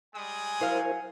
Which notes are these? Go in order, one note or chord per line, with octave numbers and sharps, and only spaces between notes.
G3 G#3 G#5 D#6
F#3 E4 A#4 C5 F5